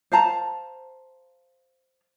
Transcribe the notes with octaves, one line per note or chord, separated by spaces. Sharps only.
C5 F5 A5 A#5